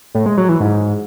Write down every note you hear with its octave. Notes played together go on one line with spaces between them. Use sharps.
A2
G#3
F#3
E3
G#2